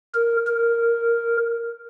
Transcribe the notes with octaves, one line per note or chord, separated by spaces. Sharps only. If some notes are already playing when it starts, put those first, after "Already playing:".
A#4
A#4